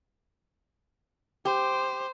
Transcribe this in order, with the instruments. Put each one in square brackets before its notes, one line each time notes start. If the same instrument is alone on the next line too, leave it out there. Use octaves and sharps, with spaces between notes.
[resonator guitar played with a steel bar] G4 [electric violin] C5